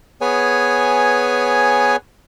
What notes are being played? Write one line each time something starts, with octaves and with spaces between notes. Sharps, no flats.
B3 G#4 B4 C#5 G#5